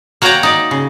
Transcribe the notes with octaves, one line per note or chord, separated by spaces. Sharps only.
A#3 F#4 C#5 D5 G5 A#5
D#4 D5
C#3